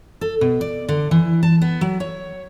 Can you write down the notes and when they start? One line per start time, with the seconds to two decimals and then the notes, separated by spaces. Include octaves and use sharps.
0.21 A4
0.41 B2
0.61 D5
0.89 D3
1.11 E3
1.43 A5
1.61 B3
1.81 F#3
2.00 C#5